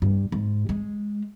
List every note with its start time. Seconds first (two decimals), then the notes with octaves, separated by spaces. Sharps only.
0.02 G2
0.32 G#2
0.69 G#3